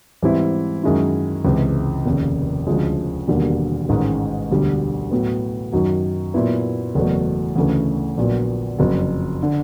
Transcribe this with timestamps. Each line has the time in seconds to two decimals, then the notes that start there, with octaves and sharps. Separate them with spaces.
0.22 G#2 E3 G3 C4 E4
0.83 F#2 D#3 G#3 C#4 E4
1.45 C#2 C3 E3 G#3
2.06 F1 D#2 C#3
2.67 D2 C#3 F3 G#3
3.28 E1 D#2 D3 G3 A#3
3.89 A1 G#2 D#3 G#3 C#4
4.51 E1 D2 D3 G3
5.11 A2 F#3 B3
5.73 F#2 D#3 F#3
6.34 A#2 F#3 B3 E4
6.95 F#1 E2 B2 F#3 A3
7.56 D2 C#3 E3 A3
8.17 A#1 A#2 F#3 B3
8.79 F#1 F2 C#3 F#3
9.43 D3